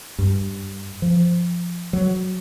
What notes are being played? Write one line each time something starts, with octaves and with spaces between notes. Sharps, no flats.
G2
F3
F#3